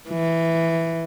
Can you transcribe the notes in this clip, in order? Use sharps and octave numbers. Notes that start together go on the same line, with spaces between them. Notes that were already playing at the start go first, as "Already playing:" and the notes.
E3